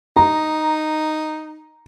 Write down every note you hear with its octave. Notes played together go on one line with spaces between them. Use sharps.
D#4 A#5